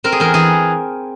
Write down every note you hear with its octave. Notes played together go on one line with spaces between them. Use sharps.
C4 A#4
G#4
E2 A#4
E3 G#4